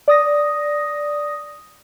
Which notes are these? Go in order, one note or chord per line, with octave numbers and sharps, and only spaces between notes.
D5 D#6 A#6